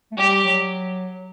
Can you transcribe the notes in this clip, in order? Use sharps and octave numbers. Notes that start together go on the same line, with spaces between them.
A3
G3 G4
F#3